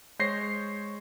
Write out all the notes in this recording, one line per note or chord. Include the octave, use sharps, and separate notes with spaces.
G#3 C5 C#5 G6 A#6 C7